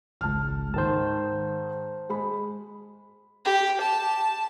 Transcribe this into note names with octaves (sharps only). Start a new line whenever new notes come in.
G#1 C#2 A5 F6
G#2 D#3 C5 A5
G#3 B5
G4
A5